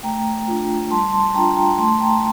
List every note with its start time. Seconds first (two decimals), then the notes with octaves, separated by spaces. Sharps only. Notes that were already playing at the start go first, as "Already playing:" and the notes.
0.03 A3 G5 A#5
0.48 D4 F4
0.91 G3 A5 C6
1.13 A5 C6
1.35 D4 F4 G5 A#5
1.56 G5 A#5
1.78 A3 A5 C6
2.00 G5 A#5